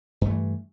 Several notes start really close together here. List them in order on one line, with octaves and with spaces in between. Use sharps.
G2 A3 E3